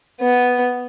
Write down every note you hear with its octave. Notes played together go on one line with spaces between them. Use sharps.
B3